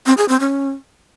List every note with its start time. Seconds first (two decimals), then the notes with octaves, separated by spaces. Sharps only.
0.06 C4
0.17 G#4
0.29 C4
0.40 C#4